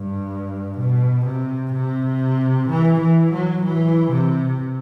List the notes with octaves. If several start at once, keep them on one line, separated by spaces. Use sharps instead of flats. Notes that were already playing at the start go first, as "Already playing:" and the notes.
Already playing: G2
B2
C3
C3
E3
E3
F#3
E3
C3